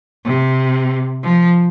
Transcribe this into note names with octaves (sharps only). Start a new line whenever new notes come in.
C3
F3